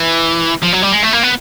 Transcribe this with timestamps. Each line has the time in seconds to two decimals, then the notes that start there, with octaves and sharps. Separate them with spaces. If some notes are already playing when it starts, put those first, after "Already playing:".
Already playing: E3
0.62 F3
0.73 F#3
0.82 G3
0.92 G#3
1.02 A3
1.13 A#3
1.23 B3